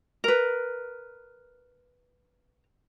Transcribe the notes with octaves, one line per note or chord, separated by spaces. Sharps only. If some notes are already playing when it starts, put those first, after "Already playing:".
A#4 B4